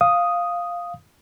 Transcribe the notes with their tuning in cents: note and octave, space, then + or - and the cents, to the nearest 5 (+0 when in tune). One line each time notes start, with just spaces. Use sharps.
F5 +0 D#6 +0